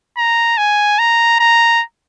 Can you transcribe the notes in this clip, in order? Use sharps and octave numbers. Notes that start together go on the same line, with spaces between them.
A#5
G#5
A#5
A#5